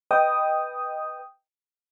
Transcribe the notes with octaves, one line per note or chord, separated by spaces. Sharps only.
B4 D#5 G5 D#6